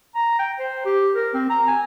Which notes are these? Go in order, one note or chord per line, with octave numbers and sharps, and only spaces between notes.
A#5
G5
C5
G4
A#4
C4
A#5
G#5